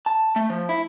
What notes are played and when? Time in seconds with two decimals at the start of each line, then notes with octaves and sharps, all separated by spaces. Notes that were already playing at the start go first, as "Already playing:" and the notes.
0.06 A5
0.36 A3
0.50 F3
0.69 E4